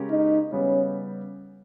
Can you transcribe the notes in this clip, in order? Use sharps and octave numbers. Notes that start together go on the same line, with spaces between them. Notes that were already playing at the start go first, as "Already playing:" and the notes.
Already playing: C#3 G#3 C#4 G4 A#4
D#4
C#3 G3 B3 C#4